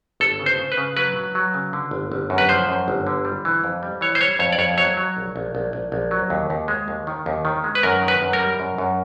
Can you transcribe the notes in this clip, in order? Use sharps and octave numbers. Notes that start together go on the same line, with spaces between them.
G1 A4
C#3
C5
C#3
B4
C#3
F#3 B4
F#3
F#3
C#3
D3
G1
G1
F#2
B4
F3 C5
F#2
G1
D3
G3
E3
F2
G3
E3 C#5
C5
G3 C#5
F2 C#5
D5
F2 C#5
F#3 C#5
F#3
A#1
A#1
A#1
A#1
A#1
F#3
D#2
D#2
G#3
D#2
D#3
D#2
D#3
G#3
B4
F#2 A#4
D#3
B4
F#2
A#4
G3
F#2
F#2